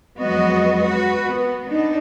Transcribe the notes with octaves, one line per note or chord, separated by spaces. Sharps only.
F2 F#3 G#3 B3 F#4 D#5
F#4 B4
B3
B3 D4 D#4